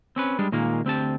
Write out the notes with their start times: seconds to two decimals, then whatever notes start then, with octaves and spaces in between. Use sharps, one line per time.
0.16 C4 C#4 B4
0.39 G3 G#3 D4
0.52 A#2 D#3 G#3 A#3
0.85 D2 C4 G4 A5